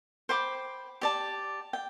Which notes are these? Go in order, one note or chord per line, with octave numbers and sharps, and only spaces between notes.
C5 G5 B5 D6
G4 D5 A5
G5